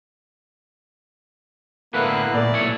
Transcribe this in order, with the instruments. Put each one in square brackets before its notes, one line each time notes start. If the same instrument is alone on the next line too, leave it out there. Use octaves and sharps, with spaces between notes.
[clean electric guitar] A2 D3 B4 [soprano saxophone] A#3 [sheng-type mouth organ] B3 E4 F#6
[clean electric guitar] A#2 [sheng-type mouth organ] A3 [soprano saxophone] D5
[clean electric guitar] B1 E4 C#5